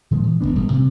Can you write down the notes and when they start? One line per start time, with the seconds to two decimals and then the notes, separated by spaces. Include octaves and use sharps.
0.11 A#2 D#3 F3 G#3
0.27 E3
0.41 E1 A#2 B3 D4
0.55 E1 A2 G3
0.73 C3